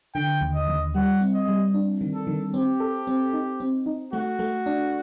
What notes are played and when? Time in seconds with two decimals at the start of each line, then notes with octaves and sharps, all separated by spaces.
0.15 D3 G5
0.41 D#2
0.55 D#5
0.68 D#2
0.95 G3 F#5
1.21 C4
1.34 D#5
1.48 G3
1.74 D4
2.01 D#3
2.14 A4
2.27 D#3
2.54 C4 G4
2.80 A4
3.07 C4
3.33 D#4
3.60 C4
3.86 D#4
4.13 A3 F#4
4.39 A3
4.66 D4